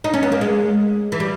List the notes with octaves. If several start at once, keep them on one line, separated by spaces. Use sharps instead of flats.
D#4
C#4
B3
A#3
G#3
E3
G3